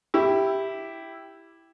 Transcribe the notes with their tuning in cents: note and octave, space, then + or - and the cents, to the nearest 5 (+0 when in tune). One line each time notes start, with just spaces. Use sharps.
E4 +0 G4 +0